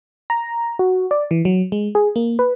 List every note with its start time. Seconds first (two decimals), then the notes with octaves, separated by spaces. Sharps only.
0.30 A#5
0.79 F#4
1.11 D5
1.31 E3
1.45 F#3
1.72 G#3
1.95 G#4
2.16 A#3
2.39 B4